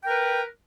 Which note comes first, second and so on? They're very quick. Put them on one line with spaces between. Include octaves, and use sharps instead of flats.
G5 A#4 B4